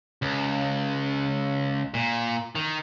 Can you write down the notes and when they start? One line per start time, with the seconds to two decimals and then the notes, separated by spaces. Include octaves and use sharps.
0.22 C#2
1.94 A#2
2.55 D#3